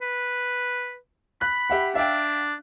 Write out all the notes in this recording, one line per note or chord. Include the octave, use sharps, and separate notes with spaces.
B4
B5 F#6
G4 E5 F#5
D4 E5 F5 G5